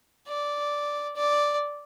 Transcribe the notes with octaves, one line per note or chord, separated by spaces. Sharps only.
D5
D5